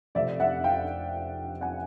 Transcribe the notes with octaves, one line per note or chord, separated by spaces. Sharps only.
F1 F2 C3 D5 E5
E5 F#5
F5 G5
F#5 G#5